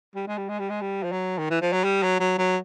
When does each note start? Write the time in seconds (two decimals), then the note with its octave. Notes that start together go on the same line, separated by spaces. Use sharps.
0.15 G3
0.27 G#3
0.38 G3
0.49 G#3
0.60 G3
0.70 G#3
0.81 G3
1.03 F3
1.12 F#3
1.38 D#3
1.50 E3
1.61 F3
1.73 F#3
1.84 G3
2.03 F#3
2.20 F#3
2.38 F#3